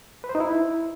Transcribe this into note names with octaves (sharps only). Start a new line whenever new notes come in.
B4
C5
D#4
E4